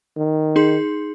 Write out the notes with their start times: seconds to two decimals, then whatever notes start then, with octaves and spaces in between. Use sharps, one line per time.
0.17 D#3
0.56 D#4 G#4 C6